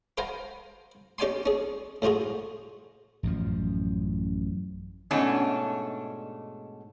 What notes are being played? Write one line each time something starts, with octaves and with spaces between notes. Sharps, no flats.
B4 C5 F5 F#5 G#5 A#5
C#4 G4 D5 G5 G#5 C6
C#4 G#4
A2 F3 F4 F#4 G#4
A1 F#2 F3
G#2 B2 A3 C#4 D4